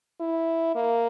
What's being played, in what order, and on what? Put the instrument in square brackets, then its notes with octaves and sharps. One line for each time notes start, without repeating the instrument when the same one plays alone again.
[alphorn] E4
A#3